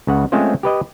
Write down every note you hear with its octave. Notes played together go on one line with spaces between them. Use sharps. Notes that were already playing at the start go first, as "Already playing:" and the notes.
C#2 C#3 F#5
G#3 A3 C4 C#4 F4 C5
G4 B4 D#5